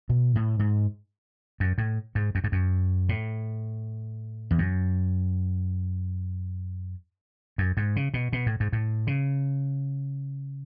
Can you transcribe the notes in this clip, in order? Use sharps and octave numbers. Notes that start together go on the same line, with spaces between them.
B2
A2
G#2
F#2
A2
G#2
F#2
G#2
F#2
A2
E2
F#2
F#2
G#2
C#3
B2
B2
A2
G#2
A2
C#3